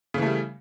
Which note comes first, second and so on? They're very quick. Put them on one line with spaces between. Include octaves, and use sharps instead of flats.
C#3 E3 A3 G3